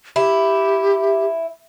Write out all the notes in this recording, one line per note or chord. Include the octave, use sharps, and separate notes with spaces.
E4 G4